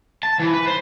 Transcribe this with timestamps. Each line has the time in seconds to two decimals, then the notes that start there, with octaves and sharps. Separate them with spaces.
0.23 A5
0.40 E3
0.54 B4
0.67 C5